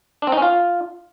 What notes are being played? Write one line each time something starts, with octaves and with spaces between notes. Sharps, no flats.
D4
C4
D#4
C#4
F4